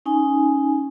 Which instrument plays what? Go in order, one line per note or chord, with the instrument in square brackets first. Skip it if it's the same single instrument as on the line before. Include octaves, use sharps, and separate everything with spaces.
[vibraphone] C#4 D#4 G#5